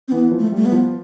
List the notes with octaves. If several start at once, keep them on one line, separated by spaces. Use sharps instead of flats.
C4
E3 B3
F3
A3
G3 A3
B3
F3